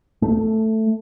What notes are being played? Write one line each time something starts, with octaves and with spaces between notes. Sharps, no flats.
A3